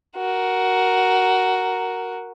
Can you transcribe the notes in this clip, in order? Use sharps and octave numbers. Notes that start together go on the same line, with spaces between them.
F#4 A#4